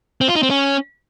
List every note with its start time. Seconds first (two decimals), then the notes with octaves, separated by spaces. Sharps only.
0.21 C4
0.28 F4
0.35 D#4
0.43 C4
0.50 C#4